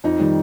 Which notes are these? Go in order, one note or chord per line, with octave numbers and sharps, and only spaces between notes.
F2 D#4
D#3 G3